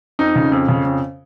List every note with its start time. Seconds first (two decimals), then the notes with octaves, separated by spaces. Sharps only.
0.19 F2 D#4
0.36 C#3
0.52 F2
0.69 C#3
0.85 F2